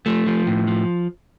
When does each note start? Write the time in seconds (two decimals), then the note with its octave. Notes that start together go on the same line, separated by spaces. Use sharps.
0.06 F3 A3
0.27 F3
0.47 A2
0.67 F3